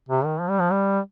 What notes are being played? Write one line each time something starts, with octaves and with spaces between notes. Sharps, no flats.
C3
D#3
F3
G3
F3
G3